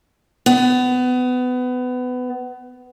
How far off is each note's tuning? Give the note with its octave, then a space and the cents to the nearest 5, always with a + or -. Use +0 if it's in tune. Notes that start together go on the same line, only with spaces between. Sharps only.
B3 +25